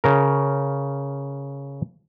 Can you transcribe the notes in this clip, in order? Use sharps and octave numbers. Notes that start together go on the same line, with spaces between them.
C#3 A#4